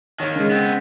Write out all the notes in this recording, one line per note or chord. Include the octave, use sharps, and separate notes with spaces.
D#3 A#3 C#5
C#3 G#3
B3 C4